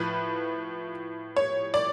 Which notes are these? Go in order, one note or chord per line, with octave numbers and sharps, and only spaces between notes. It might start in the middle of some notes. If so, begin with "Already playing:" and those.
Already playing: A2 F3 B4
C#5
D5